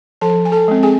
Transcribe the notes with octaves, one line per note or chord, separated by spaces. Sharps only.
F3 A4 A5
G#5
A4 A5
G#3 C4
G#4 G#5